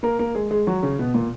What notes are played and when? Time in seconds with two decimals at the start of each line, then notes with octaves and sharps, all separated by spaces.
0.03 A#3 A#4
0.19 A#3 A#4
0.35 G#3 G#4
0.51 G#3 G#4
0.67 F#3 F#4
0.83 C#3 C#4
0.99 B2 B3
1.14 A#2 A#3